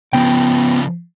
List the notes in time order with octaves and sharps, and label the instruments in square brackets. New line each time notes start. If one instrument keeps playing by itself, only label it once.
[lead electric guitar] C#3 F3 [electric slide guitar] B3 G5